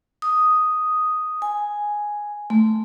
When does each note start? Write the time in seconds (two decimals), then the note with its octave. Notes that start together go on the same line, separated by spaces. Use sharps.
0.22 D#6
1.42 G#5
2.50 A3